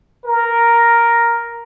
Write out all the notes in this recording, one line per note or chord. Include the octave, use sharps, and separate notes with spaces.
A#4